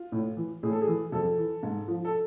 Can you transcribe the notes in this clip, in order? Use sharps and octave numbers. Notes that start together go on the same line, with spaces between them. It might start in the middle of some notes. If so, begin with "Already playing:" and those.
Already playing: F4
A2
E3
A2 G#4
A4
G#4
E3
F2 A4
E3
G#2
F3
A4